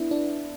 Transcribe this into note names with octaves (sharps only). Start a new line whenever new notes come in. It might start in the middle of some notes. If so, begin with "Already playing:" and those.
Already playing: B3 D4 E4
D4